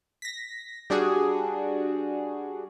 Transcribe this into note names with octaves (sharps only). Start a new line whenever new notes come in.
A#6 B6
G3 D4 F#4 G#4